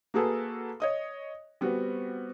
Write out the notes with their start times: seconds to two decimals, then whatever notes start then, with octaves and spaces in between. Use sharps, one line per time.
0.14 A#3 F#4 G#4 A4 B4
0.80 C#5 D#5 D#6
1.61 G3 B3 C4 F#4